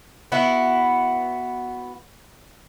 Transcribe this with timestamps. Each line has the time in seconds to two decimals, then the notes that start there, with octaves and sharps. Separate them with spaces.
0.32 B3 E4 F#4